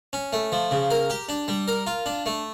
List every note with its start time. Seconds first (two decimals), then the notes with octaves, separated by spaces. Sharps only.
0.13 C#4
0.33 A3
0.52 F3
0.71 C#3
0.91 A#4
1.10 G4
1.29 D4
1.48 G3
1.68 A#4
1.87 F4
2.06 D4
2.26 A3